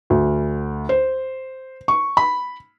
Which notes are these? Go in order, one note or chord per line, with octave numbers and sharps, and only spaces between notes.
D2
C5
C#6
B5